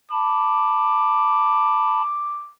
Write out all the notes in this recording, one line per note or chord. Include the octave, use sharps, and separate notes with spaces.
A5 B5 D6